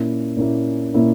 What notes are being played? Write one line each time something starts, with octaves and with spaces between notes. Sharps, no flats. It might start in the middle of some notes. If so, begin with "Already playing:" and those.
Already playing: A#2 A#3 C#4 E4
A#2 A#3 C#4 E4
A#2 A#3 C#4 E4